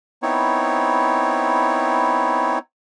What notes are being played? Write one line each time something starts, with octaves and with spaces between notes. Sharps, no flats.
B3 C4 D#4 E4 C#5